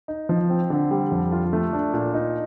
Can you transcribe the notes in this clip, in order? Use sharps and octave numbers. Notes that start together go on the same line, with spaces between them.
D#4
F3
C4
D3
G3
F2
F4
A3
D4
A#2
D#4